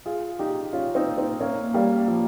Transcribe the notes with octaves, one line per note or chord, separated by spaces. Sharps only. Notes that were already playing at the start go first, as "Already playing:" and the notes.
F4 G#4
D#4 G4
C#4 F4
C4 D#4
C4 D#4
A#3 C#4
G3 A#3
F3